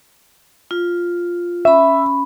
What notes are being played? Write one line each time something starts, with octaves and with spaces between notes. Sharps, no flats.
F4
C#4 E5 B5